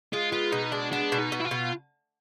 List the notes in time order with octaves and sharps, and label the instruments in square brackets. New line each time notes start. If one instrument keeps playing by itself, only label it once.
[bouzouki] G#3 [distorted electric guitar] F4
[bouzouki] B3 [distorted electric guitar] F4
[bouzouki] B2 [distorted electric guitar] D#4
[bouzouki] G#3 [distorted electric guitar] D4
[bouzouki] B3 [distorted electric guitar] D4
[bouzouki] B2
[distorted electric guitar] D#4
[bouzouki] B2
[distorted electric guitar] E4
F4
[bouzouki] B2